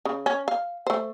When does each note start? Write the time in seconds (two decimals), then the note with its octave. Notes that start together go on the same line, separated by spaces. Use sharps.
0.05 C#3
0.26 C#4
0.48 F5
0.87 A3 C5